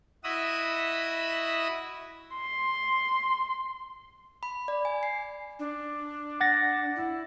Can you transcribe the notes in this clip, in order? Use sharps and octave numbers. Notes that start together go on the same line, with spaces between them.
E4 F#4 D#5 B5 D#6 E6
C6
B5
D5
G#5
C7
D4
F#5 A6 A#6
E4